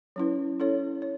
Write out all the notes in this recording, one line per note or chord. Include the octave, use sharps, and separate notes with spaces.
F#3 C#4 E4 B4
C#4 E4 A4 C#5
C#5